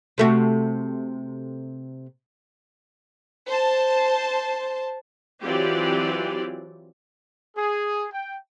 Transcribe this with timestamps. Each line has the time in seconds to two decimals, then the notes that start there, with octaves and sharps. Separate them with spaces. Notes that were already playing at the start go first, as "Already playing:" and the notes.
0.18 C3 A3 F#4
3.47 C5 A5
5.43 E3 F#3 C4 F4 G4 D5
7.57 G#4
8.13 G5